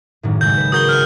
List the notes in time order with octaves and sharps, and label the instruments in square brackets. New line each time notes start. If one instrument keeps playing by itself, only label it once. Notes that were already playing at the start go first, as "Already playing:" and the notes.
[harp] G#1 F#2 A2
[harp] C#3 G#3 [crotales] G6
[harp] B4
[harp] F#4 G#4 A#4 [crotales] D#6 G6 G7
[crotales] F6 G6